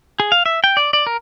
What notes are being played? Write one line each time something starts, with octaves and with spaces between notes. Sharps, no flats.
G#4
F5
E5
G5
D5
D5
A#4